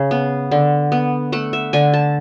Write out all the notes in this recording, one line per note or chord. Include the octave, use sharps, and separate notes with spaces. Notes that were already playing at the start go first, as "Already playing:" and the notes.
Already playing: C#3
B3
D3
B3
A3 F#5
E5
D3 G#5
A5